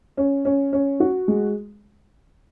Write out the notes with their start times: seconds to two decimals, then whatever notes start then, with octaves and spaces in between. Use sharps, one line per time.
0.17 C#4
0.45 C#4
0.73 C#4
1.00 F#4
1.28 G#3